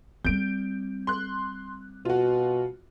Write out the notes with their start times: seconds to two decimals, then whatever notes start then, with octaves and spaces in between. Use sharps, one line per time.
0.25 G3 C4 G6 D7
1.07 C6 F#6
2.05 B2 F4 F#4